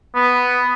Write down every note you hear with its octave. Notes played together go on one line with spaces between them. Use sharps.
B3